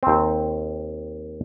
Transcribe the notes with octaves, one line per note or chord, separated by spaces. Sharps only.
D#2 C4